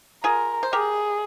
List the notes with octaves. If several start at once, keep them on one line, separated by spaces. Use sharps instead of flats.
F4 G#4 A#4
C5
G4 G#4 A#4